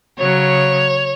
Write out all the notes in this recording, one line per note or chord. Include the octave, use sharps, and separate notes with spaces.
C#3 F#3 C#5